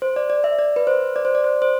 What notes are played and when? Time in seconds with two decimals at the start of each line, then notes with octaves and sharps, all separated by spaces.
0.02 C5
0.16 D5
0.30 D5
0.44 E5
0.59 D5
0.76 B4
0.87 C5
1.16 D5
1.25 C5
1.35 D5
1.44 C5
1.62 C5